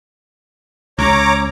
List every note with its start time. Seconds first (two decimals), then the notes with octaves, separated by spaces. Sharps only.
0.99 C#2 C#5 A#5 D6